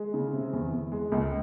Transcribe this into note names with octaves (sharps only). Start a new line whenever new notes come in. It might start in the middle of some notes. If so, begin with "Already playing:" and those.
Already playing: G#3
C#3
C3
E2
E2
G#3
C#2